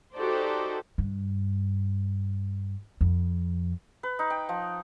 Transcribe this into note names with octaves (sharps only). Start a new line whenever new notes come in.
D#4 F#4 G4 A4 C5 D5
G2
F2
B4
D#4
G5
F3